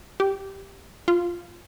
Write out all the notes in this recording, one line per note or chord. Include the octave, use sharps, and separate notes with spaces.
G4
F4